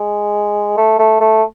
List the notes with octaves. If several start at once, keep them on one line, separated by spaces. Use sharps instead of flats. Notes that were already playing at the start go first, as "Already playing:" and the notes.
Already playing: G#3
A3
A3
A3